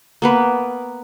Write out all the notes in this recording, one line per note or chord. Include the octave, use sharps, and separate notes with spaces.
A#3 B3 B4